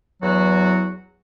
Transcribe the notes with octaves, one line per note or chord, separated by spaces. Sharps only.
E2 F#3 F#4